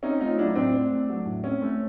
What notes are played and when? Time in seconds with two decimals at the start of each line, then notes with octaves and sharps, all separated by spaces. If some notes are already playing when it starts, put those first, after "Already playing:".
0.03 C4 C#4 D#4
0.21 A3 D#4 F4
0.38 F#3 D4 E4
0.55 A2 C4 D4
0.74 C4
0.91 A3
1.09 F#3
1.26 A2
1.44 C4 C#4
1.62 A3